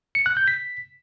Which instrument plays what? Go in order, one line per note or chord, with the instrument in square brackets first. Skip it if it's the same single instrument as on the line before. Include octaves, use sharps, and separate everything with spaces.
[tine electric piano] C#7
F#6
G6
B6